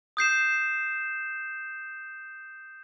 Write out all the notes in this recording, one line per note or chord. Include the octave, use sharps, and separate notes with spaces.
D#6 G6 C7 E7